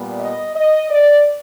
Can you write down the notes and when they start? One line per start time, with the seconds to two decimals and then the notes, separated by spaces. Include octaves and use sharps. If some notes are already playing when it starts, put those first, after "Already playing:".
Already playing: A#2 G3 B3
0.20 D#5
0.55 D#5
0.91 D5